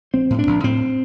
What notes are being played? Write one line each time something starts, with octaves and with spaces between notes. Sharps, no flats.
A#1 C4
A2
D4
A#1
A2 C4